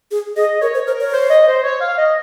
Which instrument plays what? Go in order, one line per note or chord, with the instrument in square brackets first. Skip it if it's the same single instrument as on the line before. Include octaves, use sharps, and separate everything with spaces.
[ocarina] G#4
[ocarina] G#4 [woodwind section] D#5
[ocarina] A#4 [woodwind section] C#5
[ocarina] C5
[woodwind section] A#4 [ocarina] C5
[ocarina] C#5
[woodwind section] C5
D#5
C5
C#5
F5
D#5